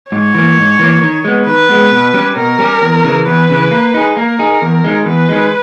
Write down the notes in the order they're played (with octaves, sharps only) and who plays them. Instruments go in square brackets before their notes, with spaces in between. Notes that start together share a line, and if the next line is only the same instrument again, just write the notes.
[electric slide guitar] G#2 [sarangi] C#5
[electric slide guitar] E3 A#3
G#2
E3 A#3
D#3
G#3 B3
[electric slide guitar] D#3 [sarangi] B4
[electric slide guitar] G#3 B3
B2
G3 C#4 G4
[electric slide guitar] B2 [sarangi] A#4
[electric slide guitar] G3 C#4 G4
E2
C#3 E3
[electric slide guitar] E2 [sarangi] B4
[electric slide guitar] C#3 E3
A#3
D#4 G#4
[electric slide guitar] A#3 [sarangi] A#4
[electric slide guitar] D#4 G#4
E2
D#3 G#3
[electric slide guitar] E2 [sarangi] B4
[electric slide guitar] D#3 G#3